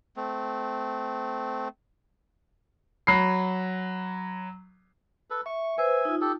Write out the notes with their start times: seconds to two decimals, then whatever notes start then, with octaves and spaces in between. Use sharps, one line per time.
0.16 A3 C4
3.07 F#3 B5 C7
5.30 A4 B4
5.46 E5 C#6
5.78 B4 C5 E5 G#5
6.05 D#4 F4
6.21 G4 A4